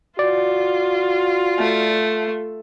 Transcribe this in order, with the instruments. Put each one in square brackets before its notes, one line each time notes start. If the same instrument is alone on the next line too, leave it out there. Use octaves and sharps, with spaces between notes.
[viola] F4 [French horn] F#4 [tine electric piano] D5
[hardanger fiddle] A3